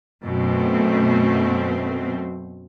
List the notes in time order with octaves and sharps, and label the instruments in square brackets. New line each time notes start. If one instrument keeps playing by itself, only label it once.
[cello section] F#2 B2 A3 C4